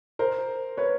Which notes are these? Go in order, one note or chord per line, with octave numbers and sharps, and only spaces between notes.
A#4 C5
B4 C#5